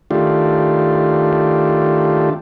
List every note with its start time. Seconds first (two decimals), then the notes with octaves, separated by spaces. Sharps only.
0.11 D#3 A3 D4 F4 G4